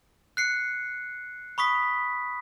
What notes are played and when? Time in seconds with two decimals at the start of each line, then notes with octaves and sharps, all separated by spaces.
0.37 F#6 C7 C#7
1.58 B5 C#6 D#6 B6